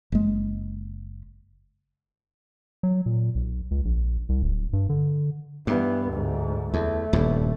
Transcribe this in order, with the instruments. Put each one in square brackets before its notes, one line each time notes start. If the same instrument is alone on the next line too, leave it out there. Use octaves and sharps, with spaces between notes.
[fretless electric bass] F#1 G#3
[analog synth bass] F#3
A#2
B1
C#2
A#1
C2
D1
G2
D3
[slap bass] G2 [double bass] E3 B3
[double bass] D2 G#2
[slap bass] E2 [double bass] A3
[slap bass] D#1 E2 G2